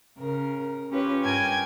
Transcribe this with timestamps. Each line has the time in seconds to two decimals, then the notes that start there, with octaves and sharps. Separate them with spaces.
0.18 C#3 A#4
0.90 C#4 F4 G4 B4 C#5
1.24 G2 A#4 G5 G#5 G#6